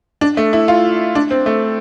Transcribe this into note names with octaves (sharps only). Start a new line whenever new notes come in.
D4
A3
E4
F4
D4
C4
A3